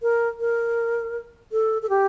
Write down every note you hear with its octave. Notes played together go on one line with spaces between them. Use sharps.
A#4
A#4
A4
A4
G4